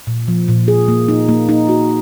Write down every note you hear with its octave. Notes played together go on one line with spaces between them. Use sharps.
A#2
F3
A#2
G#4
A#3
D#4
A#3
D#4
F#4